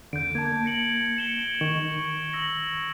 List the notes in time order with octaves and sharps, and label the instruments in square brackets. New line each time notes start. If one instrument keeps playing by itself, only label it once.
[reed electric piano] E2 D3 [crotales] G6 D7
[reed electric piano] A#3 A5 [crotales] G#6
[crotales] A#6 C#7 F#7
C#7 E7 G7
[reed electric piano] D#3 [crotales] C#6
[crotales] E6 A#6 F#7